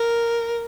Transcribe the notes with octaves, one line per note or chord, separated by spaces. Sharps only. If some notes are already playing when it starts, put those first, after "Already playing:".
Already playing: A#4